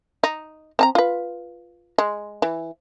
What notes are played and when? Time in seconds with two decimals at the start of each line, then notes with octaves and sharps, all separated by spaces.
0.24 D#4
0.79 C4 A5 A#5
0.95 F4 B4
1.98 G#3
2.42 E3